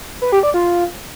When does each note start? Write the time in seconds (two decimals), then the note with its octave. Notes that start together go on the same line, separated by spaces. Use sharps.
0.22 B4
0.32 G4
0.43 D5
0.54 F4